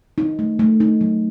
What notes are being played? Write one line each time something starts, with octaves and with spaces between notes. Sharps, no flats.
D#4
A3
A3
D#4
F#3